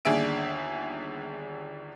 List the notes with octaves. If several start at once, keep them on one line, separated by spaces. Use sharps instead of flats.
G1 D#2 D4 G#4 E5 D7